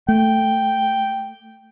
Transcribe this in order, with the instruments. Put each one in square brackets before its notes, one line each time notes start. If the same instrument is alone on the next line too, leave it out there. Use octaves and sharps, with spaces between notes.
[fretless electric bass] A3 [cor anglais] G5